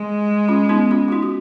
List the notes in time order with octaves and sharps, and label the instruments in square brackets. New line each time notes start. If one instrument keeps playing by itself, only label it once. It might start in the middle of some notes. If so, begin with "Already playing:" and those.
Already playing: [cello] G#3
[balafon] C#4 F4
B3 D#4
C#4 F4
F4
D#4 F#4
F#4